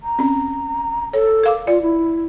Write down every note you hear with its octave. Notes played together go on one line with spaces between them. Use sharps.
A#5
C4 C#4
A4 C#5
A#4 F5 D6
F4 D5
E4